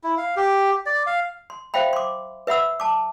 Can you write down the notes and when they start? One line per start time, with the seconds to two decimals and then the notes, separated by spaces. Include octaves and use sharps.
0.03 E4
0.17 F5
0.36 G4
0.86 D5
1.06 F5
1.50 C6
1.74 C5 E5 F5 G5 B5
1.93 C6 D6
2.47 B4 E5 F#5 B5 E6
2.80 A5 D6